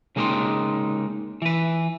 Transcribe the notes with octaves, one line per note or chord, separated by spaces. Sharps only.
C#3 G#3 A#3 D#4 G5 C6
E3 B4